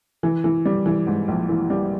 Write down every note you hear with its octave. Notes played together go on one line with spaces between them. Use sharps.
E3
E3
G3
E3
G#2
A#1
E3
G3